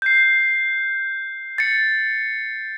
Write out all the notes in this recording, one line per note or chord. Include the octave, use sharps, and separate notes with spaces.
G6 C7
A6 C#7